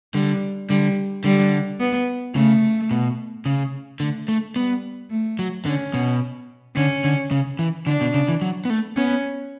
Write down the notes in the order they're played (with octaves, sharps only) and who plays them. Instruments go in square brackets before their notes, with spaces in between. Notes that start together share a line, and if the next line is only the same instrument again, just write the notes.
[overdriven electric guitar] D3 [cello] G3
[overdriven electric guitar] D3 [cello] G3
[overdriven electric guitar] D3 [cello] G3
[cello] B3
[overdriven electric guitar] C#3 [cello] A3
[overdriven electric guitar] B2
C#3
[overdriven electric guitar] D3 [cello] A3
[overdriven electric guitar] A3
[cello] G3 [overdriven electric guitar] B3
[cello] A3
[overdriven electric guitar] F#3
[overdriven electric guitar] D3 [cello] C#4
[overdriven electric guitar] B2
[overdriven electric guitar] D3 [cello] C#4
[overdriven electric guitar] D3
C#3
E3
[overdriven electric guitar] D3 [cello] D4
[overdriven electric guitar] B2
C#3
E3
F#3
B3
A3
[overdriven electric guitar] B3 [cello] C#4